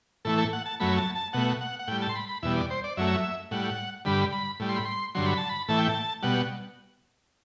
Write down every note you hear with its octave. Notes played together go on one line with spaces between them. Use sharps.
A2 E3 A3 A4
A4
F#5
A5
F#2 F#3 A3 B5
A5
A5
B2 A3 F#5
F#5
F#5
A2 G3 G5
A5
C6
B5
B5
E2 B2 G3 E5
D5
C5
D5
F#2 F#3 A3 E5
A2 G3 F#5
G2 D3 G3 B5
B5
A2 G3
C6
B5
C6
G2 D3 F#3 C6
B5
A5
B5
A2 E3 A3 A5
G5
A5
B2 G3 F#5